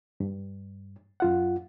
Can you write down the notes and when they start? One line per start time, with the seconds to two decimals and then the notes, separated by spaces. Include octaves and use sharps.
0.20 G2
1.20 F#2 F4 F#5